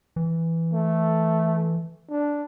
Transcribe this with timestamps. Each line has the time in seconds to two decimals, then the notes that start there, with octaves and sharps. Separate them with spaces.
0.16 E3
0.73 A3
2.10 D4